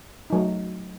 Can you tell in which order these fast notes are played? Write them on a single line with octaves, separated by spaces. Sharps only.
D#4 F#3 A3